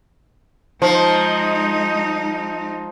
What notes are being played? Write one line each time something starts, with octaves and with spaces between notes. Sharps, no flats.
F3 G#3 D#4